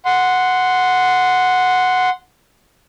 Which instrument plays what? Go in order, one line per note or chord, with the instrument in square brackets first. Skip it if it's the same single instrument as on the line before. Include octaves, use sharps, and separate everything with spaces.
[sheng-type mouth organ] F#5 C6